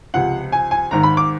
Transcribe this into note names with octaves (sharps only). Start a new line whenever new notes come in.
C#2 C3 F3 F#5
G#5
G#5
G#1 G#2 D#3 A#5
B5
D6